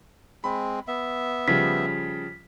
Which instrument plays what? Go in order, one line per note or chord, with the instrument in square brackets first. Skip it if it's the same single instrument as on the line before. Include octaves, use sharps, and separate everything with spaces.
[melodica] G#3 C4 [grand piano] B5
[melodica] B3 E5
[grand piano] C#3 F3 G3 [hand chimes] B6